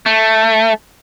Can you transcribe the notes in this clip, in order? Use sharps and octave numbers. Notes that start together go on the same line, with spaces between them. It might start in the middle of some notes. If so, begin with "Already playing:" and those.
A3